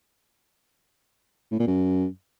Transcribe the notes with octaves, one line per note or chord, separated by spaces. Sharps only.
A2
A#2
F#2